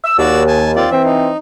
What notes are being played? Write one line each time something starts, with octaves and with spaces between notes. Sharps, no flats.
E6
D#2 F#4 D5 E6
G#5 A5
C4 F4 D5
E3 C4 E5
D#4